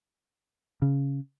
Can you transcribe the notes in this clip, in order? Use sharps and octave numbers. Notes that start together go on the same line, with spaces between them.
C#3